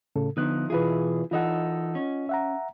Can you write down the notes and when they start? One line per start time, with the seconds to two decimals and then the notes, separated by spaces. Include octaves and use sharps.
0.16 A2 C#3 A4
0.37 D3 F3 B3 D#4 F#6
0.70 B2 E3 E4 F4 G#4 B4
1.31 E3 D#4 F4 A4 D#5 F#5
1.95 C#4
2.29 E5 F#5 A#5